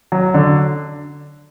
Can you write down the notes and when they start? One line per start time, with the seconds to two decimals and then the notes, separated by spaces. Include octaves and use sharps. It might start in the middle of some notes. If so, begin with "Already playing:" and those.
0.12 F#3
0.34 D3